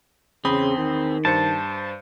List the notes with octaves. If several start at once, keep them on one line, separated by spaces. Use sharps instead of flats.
E2 C#3 C4 B5 D#6
D#3
G2 C5 A5 C#7